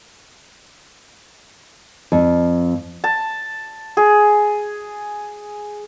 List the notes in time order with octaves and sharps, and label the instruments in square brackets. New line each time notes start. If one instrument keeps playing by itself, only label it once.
[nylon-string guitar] F2
[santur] A5
G#4